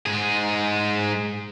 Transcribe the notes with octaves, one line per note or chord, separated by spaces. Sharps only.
G#2 G#4